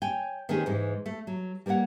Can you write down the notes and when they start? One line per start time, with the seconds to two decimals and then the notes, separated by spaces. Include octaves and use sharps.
0.02 C#5 G5 G#5
0.49 D#3 G#3 C4 C#4 G4 G#4
0.66 G#2 E3 G#3
1.06 A3
1.27 F#3
1.66 G3 A#3 B4 C#5 F#5